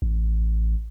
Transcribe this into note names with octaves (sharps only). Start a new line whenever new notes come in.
A1